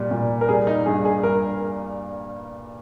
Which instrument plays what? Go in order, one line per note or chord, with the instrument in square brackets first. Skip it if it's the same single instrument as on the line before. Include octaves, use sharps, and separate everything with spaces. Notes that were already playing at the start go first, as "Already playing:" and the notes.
Already playing: [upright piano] A#2 G3
A#2
[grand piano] A#4
[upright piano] G3 [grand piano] G#4
[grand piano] D#4
[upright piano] G2 [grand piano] G#4
[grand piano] G#4
[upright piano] G2 [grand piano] A#4